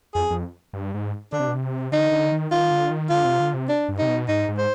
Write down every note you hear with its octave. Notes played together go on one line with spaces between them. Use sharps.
F2 G#4
F2
G2
G#2
D3 D4
C3
B2
C3
D3 D#4
D3
D#3
D#3 F4
D3
D#3
D3 F4
C3
D3
C3
D4
G2
C3 D#4
B2
G#2 D#4
G#2
C5